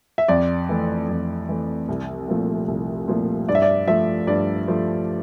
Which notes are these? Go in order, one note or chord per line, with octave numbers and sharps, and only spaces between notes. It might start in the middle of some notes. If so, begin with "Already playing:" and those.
E5
F2 D5
E3 A3
F2
E3 A3
C2
A#2 F3 A3
C2
A#2 F3 A3
G2 D5
E5
D5
F3 A3 E5
G2 D5
F3 A3